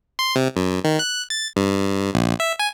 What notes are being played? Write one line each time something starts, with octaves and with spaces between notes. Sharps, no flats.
C6
C3
F#2
D#3
F#6
A6
G2
A#1
E5
G#5